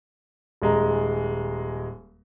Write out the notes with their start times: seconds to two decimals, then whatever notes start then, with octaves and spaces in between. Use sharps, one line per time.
0.62 D#1 G#3 A#5